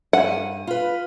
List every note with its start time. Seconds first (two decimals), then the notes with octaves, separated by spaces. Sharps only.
0.13 G2 F#5 G#5
0.67 F4 B4